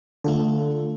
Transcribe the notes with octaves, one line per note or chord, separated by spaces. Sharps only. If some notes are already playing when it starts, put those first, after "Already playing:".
D3 A3 F4 A4